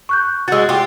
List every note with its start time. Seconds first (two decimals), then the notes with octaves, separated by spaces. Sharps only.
0.09 C#6 F#6 G6
0.48 G#3 F#4 E6 A6
0.69 F4 G4